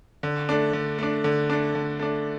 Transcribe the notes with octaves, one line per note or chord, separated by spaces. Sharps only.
D3
A3 D4
D3
A3 D4
D3
A3 D4
D3
A3 D4